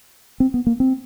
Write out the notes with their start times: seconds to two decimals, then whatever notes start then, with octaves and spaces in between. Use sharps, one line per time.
0.40 C4
0.54 B3
0.67 A#3
0.80 C4